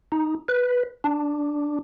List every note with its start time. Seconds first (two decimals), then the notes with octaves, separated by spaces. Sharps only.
0.12 D#4
0.48 B4
1.04 D4